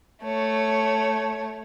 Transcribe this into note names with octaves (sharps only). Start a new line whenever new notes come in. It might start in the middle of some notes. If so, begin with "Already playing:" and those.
A3 C#5